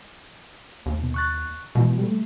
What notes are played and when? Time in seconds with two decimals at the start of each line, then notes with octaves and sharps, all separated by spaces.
0.86 D#2
1.02 B2
1.14 C#6 F#6 A6
1.75 B2 E3 G#3
1.98 G3 A3